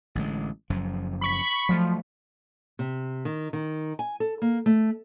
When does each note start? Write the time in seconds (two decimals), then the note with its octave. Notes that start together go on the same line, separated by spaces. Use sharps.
0.15 A1 D3 G#3
0.70 F#1 F#2 F3
1.21 B5 C#6 B6
1.69 F3 F#3 G#3 A3
2.79 C3
3.25 D#3
3.53 D#3
3.99 G#5
4.20 A4
4.42 A#3
4.66 A3